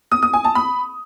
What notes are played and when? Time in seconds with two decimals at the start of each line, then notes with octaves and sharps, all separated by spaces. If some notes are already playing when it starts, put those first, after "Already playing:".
0.11 D#6
0.22 D#6
0.33 G#5
0.44 A5
0.55 B5